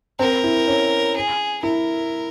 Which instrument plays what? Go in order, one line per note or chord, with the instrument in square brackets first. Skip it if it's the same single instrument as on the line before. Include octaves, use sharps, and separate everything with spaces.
[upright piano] C4 [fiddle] A#4
[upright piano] E4
C#4
[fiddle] G#4
[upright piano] E4 [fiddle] A#4